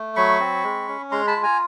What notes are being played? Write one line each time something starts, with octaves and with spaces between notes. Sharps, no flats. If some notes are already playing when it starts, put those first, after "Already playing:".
Already playing: A3
F#3 B5 C#6
C4
G#3
C#4
G#3 A#5 C6
A5 B5
F4
G#5 A#5